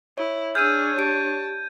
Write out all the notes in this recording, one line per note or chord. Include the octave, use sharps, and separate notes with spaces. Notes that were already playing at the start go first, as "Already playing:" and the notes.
E4 C#5
D4 G#4 C#5 E6 F6 G6 G#6 D#7
G4 A5 D7